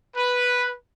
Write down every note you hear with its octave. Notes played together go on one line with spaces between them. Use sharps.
B4